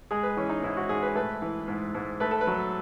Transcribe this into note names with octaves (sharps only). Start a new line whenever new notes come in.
G#3 G#4
B4
E3 C#4
D#4
G#2 E4
F#4
G#2 G#4
B4
A3 B4
E3
G#2
G#2
A3 B4
A4
B4
F#3